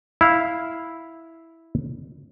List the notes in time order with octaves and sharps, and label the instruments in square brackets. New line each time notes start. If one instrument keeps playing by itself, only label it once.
[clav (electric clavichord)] E4 F5